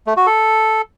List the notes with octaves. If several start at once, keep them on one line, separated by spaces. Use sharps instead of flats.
A3
F#4
A4